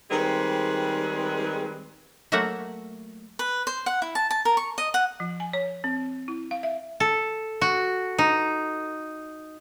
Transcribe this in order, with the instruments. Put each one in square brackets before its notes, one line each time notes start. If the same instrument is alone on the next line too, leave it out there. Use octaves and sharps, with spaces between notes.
[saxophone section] D#3 G3 G#3 C4 G#4 B4
[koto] F#3 A3 A#3 F#4 E5 F#5
[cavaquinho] B4
C5
F#5
E4
A5
A5
A#4
C#6
D#5
F#5
[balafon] F3
G#5
C#5
C4
E4
F5
E5
[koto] A4
F#4
D#4